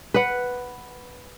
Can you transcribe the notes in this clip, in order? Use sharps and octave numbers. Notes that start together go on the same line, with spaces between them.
B4 F#5